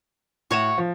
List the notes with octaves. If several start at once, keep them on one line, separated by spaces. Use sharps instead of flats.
A2 F#4 C#5 E7
F3